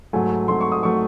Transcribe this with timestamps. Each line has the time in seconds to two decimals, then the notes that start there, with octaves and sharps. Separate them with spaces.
0.13 G#2 F#3 A3 G#5
0.48 G#2 F#3 A3 C6
0.61 C#6
0.72 D#6
0.83 F#3 A3 C#6